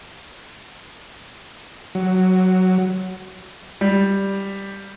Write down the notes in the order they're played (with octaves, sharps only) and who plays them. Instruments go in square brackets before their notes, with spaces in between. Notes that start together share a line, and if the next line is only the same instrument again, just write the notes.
[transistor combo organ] F#3
[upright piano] G3